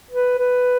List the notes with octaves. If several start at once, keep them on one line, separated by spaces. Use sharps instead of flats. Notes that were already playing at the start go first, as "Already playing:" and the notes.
B4
B4